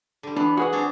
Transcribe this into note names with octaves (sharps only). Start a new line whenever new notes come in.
D3 G3
E3 B3 D4
F#4 G#4 B4 F#5
C4 D4 C#5